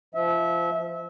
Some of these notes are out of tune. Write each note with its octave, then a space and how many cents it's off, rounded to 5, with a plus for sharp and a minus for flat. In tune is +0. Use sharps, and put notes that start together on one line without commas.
F3 -20 E5 -25